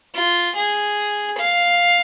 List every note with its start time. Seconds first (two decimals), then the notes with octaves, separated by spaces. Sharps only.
0.14 F4
0.55 G#4
1.37 F5